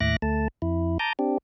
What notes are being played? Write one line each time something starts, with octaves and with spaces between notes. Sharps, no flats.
D#2 A2 E5 D6 F#6 A#6
D2 A3 A5
F2 E4
A5 A#5 D6 D#6 G6
C4 D4 G4